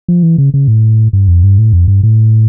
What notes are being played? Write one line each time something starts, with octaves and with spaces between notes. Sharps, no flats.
F3
E3
C#3
C#3
A2
G2
F2
G2
A2
F2
G2
A2